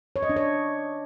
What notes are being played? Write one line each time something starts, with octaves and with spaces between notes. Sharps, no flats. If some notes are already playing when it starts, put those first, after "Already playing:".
C#5
D#5
D4
C#5